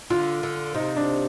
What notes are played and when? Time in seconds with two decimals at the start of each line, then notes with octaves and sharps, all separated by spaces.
0.10 D3 F4
0.43 D3
0.74 C3 D#4
0.96 D4